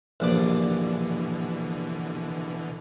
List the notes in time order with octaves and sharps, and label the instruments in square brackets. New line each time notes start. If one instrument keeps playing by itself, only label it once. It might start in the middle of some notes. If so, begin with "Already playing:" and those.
[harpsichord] A#1 G2 D5 [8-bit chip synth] B2 D3 E3